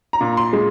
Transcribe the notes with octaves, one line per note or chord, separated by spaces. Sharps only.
A#5
A#2
C6
G#3